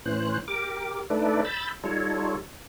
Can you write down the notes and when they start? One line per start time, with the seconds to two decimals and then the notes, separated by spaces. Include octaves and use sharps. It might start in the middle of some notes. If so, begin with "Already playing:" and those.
0.06 A2 E3 C#4 C5 F#6
0.48 G4 A#4 D6
1.10 A3 D4 D#4 A4 B4 D5
1.45 B5 E6 G6 A6
1.84 G3 D#4 F4 A4 C#5